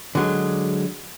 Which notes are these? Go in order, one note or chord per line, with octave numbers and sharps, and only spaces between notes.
D3 F#3 G#3